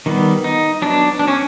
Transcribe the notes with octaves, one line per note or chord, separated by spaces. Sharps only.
D#3 G3 B3
D#4
F#3 B3 D4
D4
C#4